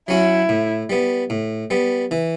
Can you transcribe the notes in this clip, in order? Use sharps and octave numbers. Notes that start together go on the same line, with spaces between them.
F#3 C#4 E4 F#4
A2
G3 B3
A2
G3 B3
E3